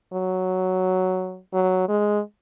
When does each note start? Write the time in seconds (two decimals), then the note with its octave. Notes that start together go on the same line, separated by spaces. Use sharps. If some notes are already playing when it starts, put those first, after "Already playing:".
0.13 F#3
1.53 F#3
1.89 G#3